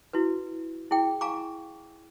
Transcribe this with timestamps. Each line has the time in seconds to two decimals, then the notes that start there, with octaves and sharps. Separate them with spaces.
0.13 E4 F#4 B4
0.91 E4 G#4 G5
1.21 F5 G#5 A#5 C#6 D6